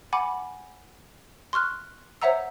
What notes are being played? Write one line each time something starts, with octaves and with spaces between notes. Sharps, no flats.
F#5 G#5 B5 D6
C6 C#6 F6 F#6
C5 C#5 E5 F#5 A#5 E6